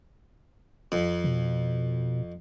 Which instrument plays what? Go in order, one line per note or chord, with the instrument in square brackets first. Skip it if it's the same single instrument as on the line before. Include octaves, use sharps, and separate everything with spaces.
[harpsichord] F2
[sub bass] B2